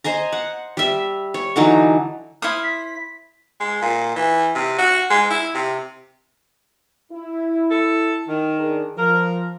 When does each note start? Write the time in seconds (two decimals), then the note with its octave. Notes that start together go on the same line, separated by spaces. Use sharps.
0.04 C5 D#5 G#5 A#5
0.32 F#5
0.77 G3 E5
1.34 C#5
1.56 D3 E3 F#3 D#4
2.42 E4 C5 D#6 F6
2.63 B6
3.60 G#3
3.82 A#2
4.16 E3
4.55 C3
4.78 F#4
5.10 G#3
5.30 E4
5.54 C3
7.13 E4
7.71 A4
8.28 D#3
8.57 D4 G#4 A#4
8.97 F3 A#4